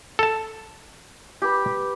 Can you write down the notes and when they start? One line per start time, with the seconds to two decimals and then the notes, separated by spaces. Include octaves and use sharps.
0.19 A4 A5
1.42 G4 B4